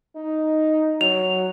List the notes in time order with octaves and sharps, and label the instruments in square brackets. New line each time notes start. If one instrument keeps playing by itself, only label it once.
[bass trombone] D#4
[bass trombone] F#3 [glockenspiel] F7